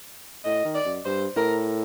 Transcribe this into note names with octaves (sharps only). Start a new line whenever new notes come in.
A2 D#5
D#3
D5
F#2
G2 C5
A2 A#4